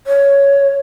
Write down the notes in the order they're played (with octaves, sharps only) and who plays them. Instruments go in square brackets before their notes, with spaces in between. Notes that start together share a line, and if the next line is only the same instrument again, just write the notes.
[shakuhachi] C#5